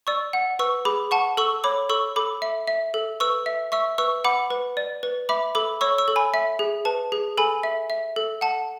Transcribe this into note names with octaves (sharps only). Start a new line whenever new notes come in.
D5 C#6 E6
F#5
B4 C#6 E6
G#4 B5 D6
F#5 A5 C#6
A4 C#6 E6
C#5 B5 D6
A4 C#6 E6
A4 B5 D6
E5
E5
A4
B4 C#6 E6
E5
E5 C#6 E6
B4 C#6 E6
F#5 B5 D6
B4
D5
B4
E5 B5 D6
A4 B5 D6
C#5 C#6 E6
C#6 E6
A4
G#5 B5
E5
G#4
B4 A5
G#4
A4 G#5 B5
E5
E5
A4
F#5 A5